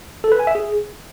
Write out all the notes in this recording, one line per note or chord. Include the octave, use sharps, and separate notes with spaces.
A4
B4
G#5
E5
G#4